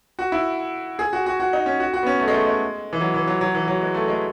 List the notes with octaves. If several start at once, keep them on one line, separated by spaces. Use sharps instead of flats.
F#4
E4
G#4
F#4
F#4
F#4
D#4
C#4
F#4
F#4
B3
C#4
A3
G#3
A3
G#3
E3
F#3
E3
F#3
F#3
E3
F#3
G#3
A3
G#3